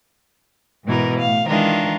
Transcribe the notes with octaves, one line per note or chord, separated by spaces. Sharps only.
G#2 B2 E3 A#4
A2 F5
D#3 E3 G#3 D4 F4 A#4